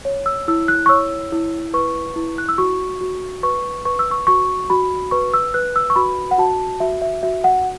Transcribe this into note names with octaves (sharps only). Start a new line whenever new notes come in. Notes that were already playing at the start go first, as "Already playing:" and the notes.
C#5
E6
E4 E6
F#6
C#6
C#5 E6
E4
B4 C#6
E4
F#6
E6
F#4 C#6
F#4
B4 C#6
B4 C#6
E6
C#6
F#4 C#6
F#4 B5
B4 C#6
E6
B4 F#6
E6
C#6
F#4 B5
F#5
F#4 A5
F#4 E5
E5
F#4 E5
F#5